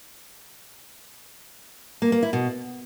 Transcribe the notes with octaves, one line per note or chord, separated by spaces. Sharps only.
A#3
A#3
E4
B2